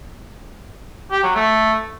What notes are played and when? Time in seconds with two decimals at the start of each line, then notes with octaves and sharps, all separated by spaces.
1.12 G4
1.24 F#3
1.35 A3